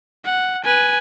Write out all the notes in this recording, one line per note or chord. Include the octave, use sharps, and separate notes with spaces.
F#5
B4 G#5